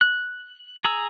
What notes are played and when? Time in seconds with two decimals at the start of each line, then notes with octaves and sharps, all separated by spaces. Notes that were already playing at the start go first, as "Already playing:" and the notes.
0.01 F#6
0.85 G#4 A#5 E6